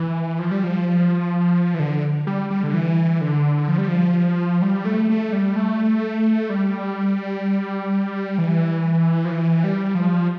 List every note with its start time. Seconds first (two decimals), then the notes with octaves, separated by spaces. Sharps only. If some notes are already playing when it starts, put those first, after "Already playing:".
Already playing: E3
0.39 F3
0.51 G3
0.63 F3
1.74 E3
1.80 D3
2.27 G3
2.50 G3
2.63 D3
2.74 E3
3.21 D3
3.68 F3
3.78 G3
3.88 F3
4.62 G3
4.85 A3
5.10 A3
5.33 G3
5.56 A3
6.50 G3
8.38 E3
9.25 F3
9.32 E3
9.64 G3
9.95 F3